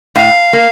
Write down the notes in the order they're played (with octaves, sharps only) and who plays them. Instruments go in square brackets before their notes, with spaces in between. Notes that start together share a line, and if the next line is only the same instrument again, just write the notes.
[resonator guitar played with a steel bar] A2 [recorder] F5
[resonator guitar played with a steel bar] A#3